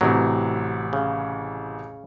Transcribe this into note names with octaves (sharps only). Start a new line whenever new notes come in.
A1 C3 E3 F#3
C#3